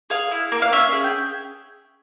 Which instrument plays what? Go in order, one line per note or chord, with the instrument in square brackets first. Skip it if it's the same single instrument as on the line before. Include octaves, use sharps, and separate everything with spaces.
[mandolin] G#4 F5
E4
A#3
F5
C#4 E5
G#4
G5